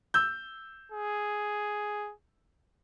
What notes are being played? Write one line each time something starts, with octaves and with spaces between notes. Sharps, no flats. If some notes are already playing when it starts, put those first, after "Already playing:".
E6 G6
G#4